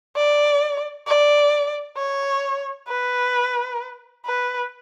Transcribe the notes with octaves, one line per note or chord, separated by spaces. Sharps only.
D5
D5
C#5
B4
B4